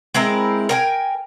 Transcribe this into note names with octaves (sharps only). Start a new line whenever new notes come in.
G#3 C4 E4 A#4
A#4 G5 G#5